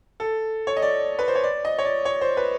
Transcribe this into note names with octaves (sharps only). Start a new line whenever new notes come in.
A4
C#5
D#5
D5
B4
C5
C#5
D5
D#5
C#5
D5
C#5
C5
B4